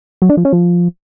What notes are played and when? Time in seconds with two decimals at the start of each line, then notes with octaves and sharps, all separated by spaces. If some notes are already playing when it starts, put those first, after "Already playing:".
0.22 F#3
0.29 D4
0.37 F3
0.45 C#4
0.53 F3